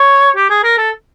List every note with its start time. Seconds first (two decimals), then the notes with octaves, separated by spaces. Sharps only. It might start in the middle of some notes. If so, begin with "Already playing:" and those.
Already playing: C#5
0.36 G4
0.50 G#4
0.63 A#4
0.78 A4